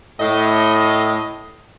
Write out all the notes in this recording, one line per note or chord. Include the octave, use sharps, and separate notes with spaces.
A2 D#5